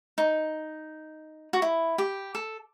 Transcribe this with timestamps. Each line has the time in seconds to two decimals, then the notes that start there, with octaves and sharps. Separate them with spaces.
0.18 D#4
1.53 F#4
1.62 E4
1.98 G4
2.35 A4